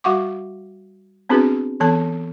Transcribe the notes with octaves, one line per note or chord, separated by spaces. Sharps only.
G3 F#4 E5 F#5 C#6 D6
B3 C4 D4 F#4 G#4 B4
E3 B3 A4 A5